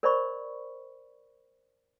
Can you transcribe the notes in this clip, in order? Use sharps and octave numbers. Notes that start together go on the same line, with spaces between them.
A#4 C5 D5 D#5 B5 C#6